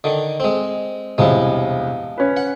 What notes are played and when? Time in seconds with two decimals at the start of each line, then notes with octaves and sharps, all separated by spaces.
0.04 D3 D#3
0.40 G#3 C4
1.18 E1 C2 F3 G#3 E4
2.17 C#4 B4
2.37 F#5